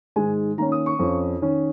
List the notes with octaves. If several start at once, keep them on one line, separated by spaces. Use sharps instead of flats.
G#2 D#3 G#3 G#5
D#3 A#3 C#4 A#5
D#6
C#6
F2 F3 C#4
D#3 C#4